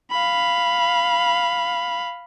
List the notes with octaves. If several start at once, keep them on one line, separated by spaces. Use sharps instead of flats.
F5 B5